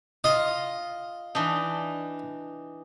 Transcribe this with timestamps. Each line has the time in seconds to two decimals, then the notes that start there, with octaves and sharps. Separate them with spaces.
0.24 F4 D#5 A#5
1.35 E3 D4 D#4